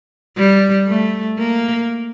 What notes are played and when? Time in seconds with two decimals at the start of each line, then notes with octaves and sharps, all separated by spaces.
0.37 G3
0.87 A3
1.39 A#3